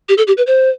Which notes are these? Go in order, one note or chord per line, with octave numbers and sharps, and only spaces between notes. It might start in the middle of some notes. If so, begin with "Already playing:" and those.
G4
A4
G4
B4
C5